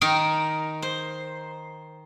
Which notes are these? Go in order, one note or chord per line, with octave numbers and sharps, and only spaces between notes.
D#3 D#4 A#4
C5